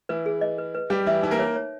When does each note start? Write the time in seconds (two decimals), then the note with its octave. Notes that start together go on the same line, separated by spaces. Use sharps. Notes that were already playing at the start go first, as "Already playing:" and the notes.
0.09 E3 E4 B4
0.26 G#4
0.41 D#5
0.58 B4
0.75 B4
0.90 G3 G4 B4
1.06 E3 E4 E5
1.22 E3 D#4 E4
1.31 A#3 A#4
1.39 C#5
1.56 C#5